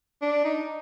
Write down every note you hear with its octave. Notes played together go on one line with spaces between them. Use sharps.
D4
D#4